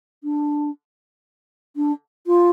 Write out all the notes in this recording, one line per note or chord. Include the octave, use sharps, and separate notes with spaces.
D4
D4
F4